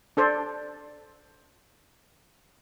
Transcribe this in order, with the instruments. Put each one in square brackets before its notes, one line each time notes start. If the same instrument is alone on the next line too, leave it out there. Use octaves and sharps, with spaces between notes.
[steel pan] D4 A4 C5 D5